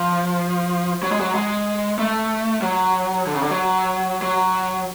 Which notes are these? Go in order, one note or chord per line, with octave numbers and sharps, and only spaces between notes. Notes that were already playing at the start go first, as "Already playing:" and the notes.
Already playing: F3
F#3
G#3
F#3
G#3
A3
F#3
D3
C#3
D3
F#3
F#3